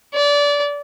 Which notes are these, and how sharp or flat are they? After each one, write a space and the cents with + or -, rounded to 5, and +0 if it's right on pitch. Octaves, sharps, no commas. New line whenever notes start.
D5 -25